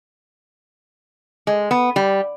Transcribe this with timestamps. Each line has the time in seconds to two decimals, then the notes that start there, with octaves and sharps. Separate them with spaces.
1.47 G#3
1.71 B3
1.96 G3